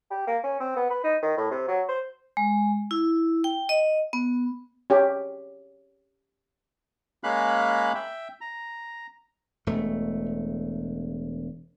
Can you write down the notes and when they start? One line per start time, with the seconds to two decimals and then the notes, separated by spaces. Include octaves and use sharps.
0.11 G4
0.27 A#3
0.44 C#4
0.60 C4
0.76 B3
0.90 B4
1.04 D#4
1.22 D#3
1.37 A2
1.51 C3
1.68 F#3
1.89 C5
2.37 G#3
2.91 E4
3.44 G5
3.69 D#5
4.13 B3
4.90 C#4 G4
7.24 G#3 A#3 C#4 F5 B5 F#6
7.95 E5 G5
8.41 A#5
9.67 E1 A3